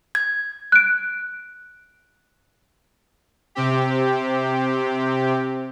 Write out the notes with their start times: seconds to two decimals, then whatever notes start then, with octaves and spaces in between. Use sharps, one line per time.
0.15 G#6
0.72 F#6 D7
3.55 C3 C4 G4